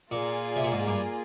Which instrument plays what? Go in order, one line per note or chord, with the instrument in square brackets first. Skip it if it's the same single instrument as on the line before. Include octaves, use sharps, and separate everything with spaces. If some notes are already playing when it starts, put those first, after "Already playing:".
[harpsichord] A#2 [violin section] A#3 F4 G#4 D5 G#5
[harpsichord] C3
A#2
G#2
G2